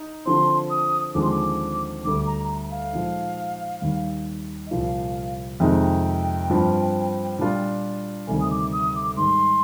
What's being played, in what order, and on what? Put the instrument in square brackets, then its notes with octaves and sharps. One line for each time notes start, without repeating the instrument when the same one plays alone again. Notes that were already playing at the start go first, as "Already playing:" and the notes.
Already playing: [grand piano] D#4
[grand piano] D3 F3 C4 [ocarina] C6
[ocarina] D#6
[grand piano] D#2 D3 F3 G#3 C4 [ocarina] D6
[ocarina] C6
D6
[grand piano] D2 D3 G3 D4 [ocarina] D6
[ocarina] A#5
F5
[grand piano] A#2 F3 G#3 D#4
D#2 D#3 G3
[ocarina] D#5
[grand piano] C2 A#2 F3 [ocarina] F5
[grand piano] F2 C3 D#3 G#3 D#4 [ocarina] G5
[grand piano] G2 F3 C4
A#2 G3 D4 F4
[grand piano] D2 C3 D#3 G3 [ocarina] G#5
[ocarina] D#6
D6
D#6
D6
[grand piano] G#2 D#3 G3 [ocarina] C6